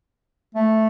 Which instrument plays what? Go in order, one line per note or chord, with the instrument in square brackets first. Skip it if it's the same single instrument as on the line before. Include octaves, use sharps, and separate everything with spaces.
[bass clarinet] A3